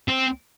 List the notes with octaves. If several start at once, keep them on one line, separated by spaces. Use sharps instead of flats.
C4